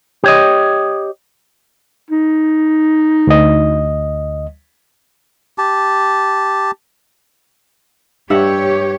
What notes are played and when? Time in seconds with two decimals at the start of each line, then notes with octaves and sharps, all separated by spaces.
0.24 G4 C#5 D#5
2.11 D#4
3.27 D2 D#5
5.58 G4 A5
8.30 G2 G4 C#5 E5 F#5